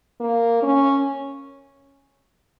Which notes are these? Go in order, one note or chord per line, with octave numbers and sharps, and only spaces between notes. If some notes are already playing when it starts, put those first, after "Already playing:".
A#3
C#4